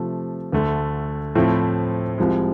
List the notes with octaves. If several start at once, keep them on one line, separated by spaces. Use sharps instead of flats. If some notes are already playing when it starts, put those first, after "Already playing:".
Already playing: C3 F3 A3
D2 D3 A3
A2 F3 A3 C4 E4
C2 C3 F3 G#3